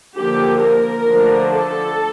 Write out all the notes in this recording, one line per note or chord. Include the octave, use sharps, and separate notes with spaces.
D3 F3 A#3 G4
A#4
D3 F3 A3 D4
A4